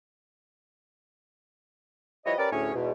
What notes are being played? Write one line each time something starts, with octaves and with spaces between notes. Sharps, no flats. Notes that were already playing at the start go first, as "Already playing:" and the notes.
F3 G3 E4 B4 C#5 D#5
C#4 G4 A#4 B4 D5
D2 A2 C#4 G#4 C#5
E2 G#2 B2